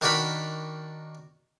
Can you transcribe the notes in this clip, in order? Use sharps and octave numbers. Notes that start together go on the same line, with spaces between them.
D#3 D4 D#4 F#4 A#4 B5